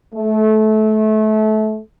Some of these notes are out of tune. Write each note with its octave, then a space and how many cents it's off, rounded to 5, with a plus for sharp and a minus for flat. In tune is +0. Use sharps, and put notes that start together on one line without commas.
A3 -25